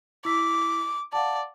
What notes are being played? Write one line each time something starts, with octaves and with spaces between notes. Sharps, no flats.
E4 D6 E6 B6
D5 F5 F#5 A5